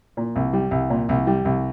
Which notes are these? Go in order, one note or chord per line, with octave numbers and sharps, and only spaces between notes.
A#2
C2
G3
C2
A#2
C2
G3
C2